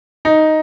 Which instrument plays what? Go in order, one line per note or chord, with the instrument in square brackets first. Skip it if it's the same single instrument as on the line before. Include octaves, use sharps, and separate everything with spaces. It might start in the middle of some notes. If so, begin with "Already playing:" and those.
[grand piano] D#4